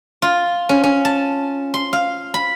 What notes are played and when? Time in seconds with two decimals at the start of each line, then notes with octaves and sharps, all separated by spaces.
0.22 F4
0.69 C#4
0.83 C#4
1.05 A5
1.74 C6
1.93 F5
2.34 B5